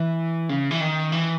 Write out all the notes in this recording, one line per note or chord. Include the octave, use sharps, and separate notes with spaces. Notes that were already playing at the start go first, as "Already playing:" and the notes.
Already playing: E3
C#3
E3
D#3
E3